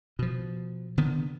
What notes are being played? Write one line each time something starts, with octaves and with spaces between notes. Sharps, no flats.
B2 F3
D3 D#3 B3